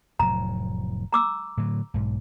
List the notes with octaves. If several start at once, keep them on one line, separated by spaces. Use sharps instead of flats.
F1 A2 F#3 A#5
A#5 D6 E6
A2 D3 F#3
B1 G#2